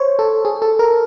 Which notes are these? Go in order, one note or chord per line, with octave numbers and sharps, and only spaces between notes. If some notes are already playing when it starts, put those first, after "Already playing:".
Already playing: C5 C#5
A4
G#4
A4
A#4